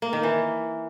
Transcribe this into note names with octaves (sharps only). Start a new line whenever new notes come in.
A#3
D#3
E3